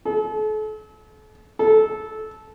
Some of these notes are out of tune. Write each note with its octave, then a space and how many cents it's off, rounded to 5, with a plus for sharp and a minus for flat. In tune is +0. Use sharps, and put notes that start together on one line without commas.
A4 -40
A4 -15